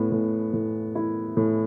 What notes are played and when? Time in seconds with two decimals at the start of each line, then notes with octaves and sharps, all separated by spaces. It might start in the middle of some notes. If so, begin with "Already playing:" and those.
Already playing: A2 B3
0.12 A2
0.53 A2
0.95 E4
1.37 A2